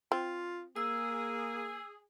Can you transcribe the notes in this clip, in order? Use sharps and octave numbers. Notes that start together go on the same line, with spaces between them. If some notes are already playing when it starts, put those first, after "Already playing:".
C4 F4
A#3 G#4 E6